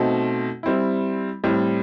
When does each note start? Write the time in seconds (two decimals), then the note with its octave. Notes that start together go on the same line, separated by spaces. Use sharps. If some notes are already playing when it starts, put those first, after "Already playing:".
Already playing: B2 A3 C4 D#4
0.63 G3 C4 E4
1.44 A2 G3 C4